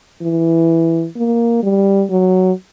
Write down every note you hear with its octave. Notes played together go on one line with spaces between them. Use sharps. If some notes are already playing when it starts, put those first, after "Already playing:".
E3
A#3
G3
F#3